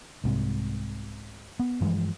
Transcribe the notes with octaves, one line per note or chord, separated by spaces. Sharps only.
C2 G#2 C3
B3
G2 E3 F3 G#3